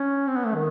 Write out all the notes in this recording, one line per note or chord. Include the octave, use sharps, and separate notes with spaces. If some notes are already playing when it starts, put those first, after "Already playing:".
Already playing: C#4
C4
B3
A3
D#3